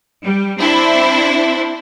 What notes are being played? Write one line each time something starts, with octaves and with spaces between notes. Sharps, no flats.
G3
C4 D4 E4 C5